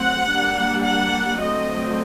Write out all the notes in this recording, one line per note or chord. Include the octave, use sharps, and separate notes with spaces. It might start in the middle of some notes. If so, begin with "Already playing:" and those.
Already playing: F#3 A3 C4 F#5
G3 A#3 D4
F#5
D3 F#3 A3 C4 D#5